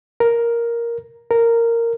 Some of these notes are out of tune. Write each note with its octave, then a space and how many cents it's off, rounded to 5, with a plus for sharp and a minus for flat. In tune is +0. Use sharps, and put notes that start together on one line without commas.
A#4 +5
A#4 -10